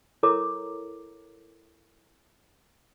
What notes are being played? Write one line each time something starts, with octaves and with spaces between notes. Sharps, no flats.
E4 A4 A#4 C#5 A#5 D6